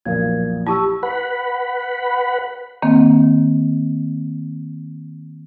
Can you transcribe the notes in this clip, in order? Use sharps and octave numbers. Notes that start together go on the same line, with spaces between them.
B1 F2 A#2 A#4 F5 G#6
E4 G4 A5 C#6 E6
B4 F#5 B5
D#3 A#3 C4